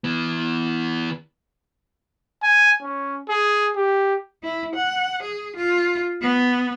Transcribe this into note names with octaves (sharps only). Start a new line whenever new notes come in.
E3 B3
G#5
C#4
G#4
G4
E4
F#5
G#4
F4
B3